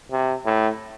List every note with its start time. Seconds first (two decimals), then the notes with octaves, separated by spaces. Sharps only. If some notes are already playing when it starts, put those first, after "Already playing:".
0.12 C3
0.45 A2